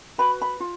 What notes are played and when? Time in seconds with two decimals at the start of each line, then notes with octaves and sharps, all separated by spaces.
0.18 F#4 B4 B5
0.41 B5
0.60 F4